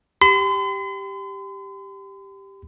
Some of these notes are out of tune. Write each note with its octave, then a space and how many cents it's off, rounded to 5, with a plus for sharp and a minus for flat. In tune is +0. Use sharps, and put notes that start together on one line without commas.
G4 +0 C6 -45